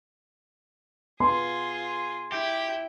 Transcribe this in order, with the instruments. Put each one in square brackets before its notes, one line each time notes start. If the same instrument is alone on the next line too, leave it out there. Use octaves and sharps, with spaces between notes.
[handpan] B3 [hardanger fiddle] F4 G#4 [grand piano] C6
[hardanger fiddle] E4 G5 [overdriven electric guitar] G4